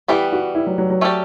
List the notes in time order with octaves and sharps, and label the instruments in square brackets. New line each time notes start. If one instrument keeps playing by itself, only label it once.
[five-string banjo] E3 G3 B3 [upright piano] G4
[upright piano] F#4
E4
F#3
F#3
F#3
[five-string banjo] A3 C#4 G4 D5